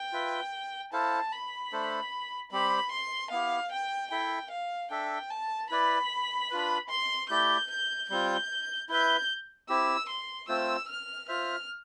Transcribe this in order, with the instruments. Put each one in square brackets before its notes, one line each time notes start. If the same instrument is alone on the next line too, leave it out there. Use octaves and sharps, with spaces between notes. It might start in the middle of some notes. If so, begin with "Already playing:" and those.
Already playing: [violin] G5
[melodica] F4 B4 E5
[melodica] E4 A4 C5 F5 [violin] A5
[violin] B5
[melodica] A3 D4 A4 C5
[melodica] G3 C4 G4 C5 [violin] B5
[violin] C6
[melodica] B3 E4 G4 [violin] F5
[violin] G5
[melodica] E4 A4 E5 [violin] G5
[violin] F5
[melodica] D4 A4 E5 [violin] G5
[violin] A5
[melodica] E4 B4 D5 [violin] B5
[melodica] D4 F4 B4
[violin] C6
[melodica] A3 E4 G4 D5 [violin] G6
[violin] G6
[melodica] G3 C4 F4 [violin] G6
[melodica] E4 B4 E5 [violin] G6
[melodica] C4 E4 G4 [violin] E6
[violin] C6
[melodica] A3 C4 F4 C5 [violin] E6
[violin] F6
[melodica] F4 C5 E5 [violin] F6